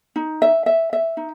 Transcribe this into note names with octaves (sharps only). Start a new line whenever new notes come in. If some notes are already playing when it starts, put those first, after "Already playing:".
D#4
E5
E5
E5
D#4